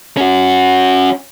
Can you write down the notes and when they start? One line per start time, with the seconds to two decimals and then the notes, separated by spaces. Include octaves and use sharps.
0.17 C#4 F#4